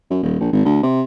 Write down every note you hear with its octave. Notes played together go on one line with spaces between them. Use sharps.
F#2
D#1
A#1
G#1
D2
C3